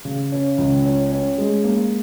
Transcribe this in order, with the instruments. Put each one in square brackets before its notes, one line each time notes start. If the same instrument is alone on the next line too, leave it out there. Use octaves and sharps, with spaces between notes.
[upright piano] C#3
C#4
C#2
C#4
C#4
G#3
A#3